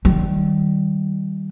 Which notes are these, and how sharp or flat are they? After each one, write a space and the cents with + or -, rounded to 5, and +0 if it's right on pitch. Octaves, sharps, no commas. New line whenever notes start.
D#3 +0 G3 -25